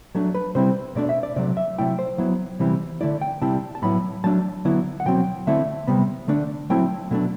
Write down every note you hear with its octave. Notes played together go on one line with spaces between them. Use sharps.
F#3 A3 D4
B4
C3 G3 C4 E4 C5
B2 A3 D4 D5
E5
D5
C3 F#3 A3 D5
E5
C3 F#3 A3 E4 G5
C5
F#3 B3 E4
C3 E3 G3 C4 E4
D3 A3 E4 D5
G5
C3 G3 C4 E4 A5
A5
A2 F#3 B3 E4 B5
F#3 A3 D4 A5
D3 F#3 B3 E4
F#5
B2 F#3 C4 G5
D3 A3 C4 E4 E5
C3 G3 B3
D3 A3 D4
F#3 A3 C4 E4 G5
B2 F#3 A3 D4